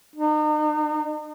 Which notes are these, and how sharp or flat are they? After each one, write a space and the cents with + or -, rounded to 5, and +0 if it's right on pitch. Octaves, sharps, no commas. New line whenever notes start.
D#4 -40